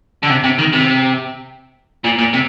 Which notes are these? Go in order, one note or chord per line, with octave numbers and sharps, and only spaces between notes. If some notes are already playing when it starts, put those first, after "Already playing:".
D3
C3
C3
D#3
C3
A#2
A#2
C3